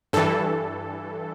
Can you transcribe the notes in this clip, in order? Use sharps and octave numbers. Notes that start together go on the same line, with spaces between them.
G2 E3 A4